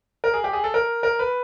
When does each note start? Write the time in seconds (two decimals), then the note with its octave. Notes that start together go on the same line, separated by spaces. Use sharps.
0.24 A#4
0.34 G#4
0.44 G4
0.53 G#4
0.64 A4
0.74 A#4
1.03 A#4
1.19 B4